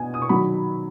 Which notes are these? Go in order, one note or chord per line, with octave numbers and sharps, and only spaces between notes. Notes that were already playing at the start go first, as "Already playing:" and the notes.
Already playing: B2 G#5
D#6
C#6
D#3 F#3 B5